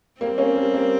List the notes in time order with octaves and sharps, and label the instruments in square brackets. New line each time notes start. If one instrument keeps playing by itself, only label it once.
[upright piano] G3 A#3 [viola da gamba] C4
[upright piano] A#3 C#4
G3 A#3
G3 A#3